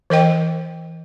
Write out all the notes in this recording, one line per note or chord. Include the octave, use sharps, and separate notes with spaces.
E3 A#4 D#5 G5